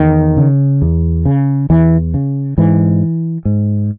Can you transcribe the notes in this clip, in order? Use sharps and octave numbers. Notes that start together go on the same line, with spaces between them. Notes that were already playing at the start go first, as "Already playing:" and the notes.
Already playing: E2 D#3
C#3
E2
C#3
E2 E3
C#3
G#2 E3
G#2